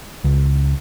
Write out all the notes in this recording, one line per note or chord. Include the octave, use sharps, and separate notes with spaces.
C#2